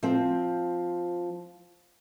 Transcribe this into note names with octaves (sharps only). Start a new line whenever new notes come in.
F3 C4